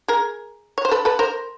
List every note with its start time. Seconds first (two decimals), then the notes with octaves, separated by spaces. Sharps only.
0.08 G#4 A#4
0.78 C#5
0.85 C5
0.91 A4 B4
1.05 A4 B4
1.19 A#4 C5